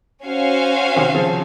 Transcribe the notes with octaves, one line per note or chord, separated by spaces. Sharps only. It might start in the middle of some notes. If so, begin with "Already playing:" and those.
C#4 F#4 C5 F5 G#5
C3 D#3
C#3 F3